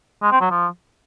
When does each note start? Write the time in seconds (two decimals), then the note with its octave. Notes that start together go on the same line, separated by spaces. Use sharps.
0.22 G#3
0.32 C4
0.41 F#3
0.50 F3